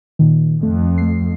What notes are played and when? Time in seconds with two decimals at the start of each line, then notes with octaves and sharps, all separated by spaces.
0.19 A#2 D#3
0.63 F2 A3
0.98 A3 C7